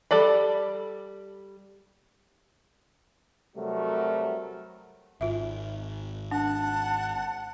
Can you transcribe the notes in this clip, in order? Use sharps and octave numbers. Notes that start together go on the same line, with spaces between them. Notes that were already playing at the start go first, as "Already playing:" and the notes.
G3 A4 D5 B5
C3 F#3 G3 A3 F#4 A#4
G#1 F4 E5
D4 F#5 A5